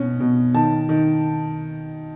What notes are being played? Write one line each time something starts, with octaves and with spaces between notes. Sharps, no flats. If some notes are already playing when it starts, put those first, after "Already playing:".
Already playing: B2 C#4
B2
D#3 A5
D#3